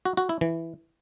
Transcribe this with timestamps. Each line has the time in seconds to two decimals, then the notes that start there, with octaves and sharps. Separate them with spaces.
0.06 F#4
0.17 F#4
0.29 E4
0.41 E3